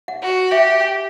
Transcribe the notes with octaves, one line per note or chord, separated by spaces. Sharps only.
F#5
F#4
G4 E5